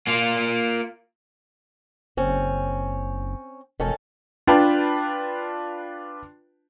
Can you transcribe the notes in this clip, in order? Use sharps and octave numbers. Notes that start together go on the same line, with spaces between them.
A#3 F4
F#1 C4 C#4
E1 D#3 C#4 A4
D4 F4 B4 G5 A5